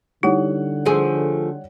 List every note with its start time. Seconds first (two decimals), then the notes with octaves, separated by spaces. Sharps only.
0.23 D3 G3 D#4 E4 C#5 F#5
0.85 F3 A3 G#4